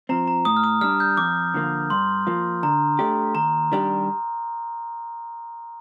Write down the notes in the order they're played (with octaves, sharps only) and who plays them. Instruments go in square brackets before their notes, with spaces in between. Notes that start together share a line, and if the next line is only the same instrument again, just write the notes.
[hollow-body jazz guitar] F3 C4 [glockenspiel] A#5
[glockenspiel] A#5
[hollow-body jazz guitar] A2 [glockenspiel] D#6
[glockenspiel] F6
D#6
[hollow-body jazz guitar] G3 D4 [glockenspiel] F6
[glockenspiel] G6
[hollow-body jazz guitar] F2 [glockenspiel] D6
[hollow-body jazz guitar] D3 F3 A#3 F4
[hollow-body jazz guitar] G2 [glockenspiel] C6
[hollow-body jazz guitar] F3 A#3 F4
[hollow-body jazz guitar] D3 [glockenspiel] A#5
[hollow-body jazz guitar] A3 D4 G4
[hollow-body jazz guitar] D#2 [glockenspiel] A#5
[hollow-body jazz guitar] D#3 G3 D4 G4